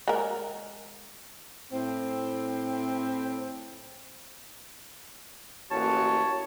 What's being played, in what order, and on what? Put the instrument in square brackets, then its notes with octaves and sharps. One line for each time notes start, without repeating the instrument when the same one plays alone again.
[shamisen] G#3 A#4
[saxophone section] A2 C4
[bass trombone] A1 [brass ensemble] A#3 F#4 [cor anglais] C#5 [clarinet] A5